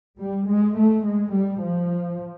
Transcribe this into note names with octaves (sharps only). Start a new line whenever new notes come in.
G3
G#3
A3
G#3
G3
F3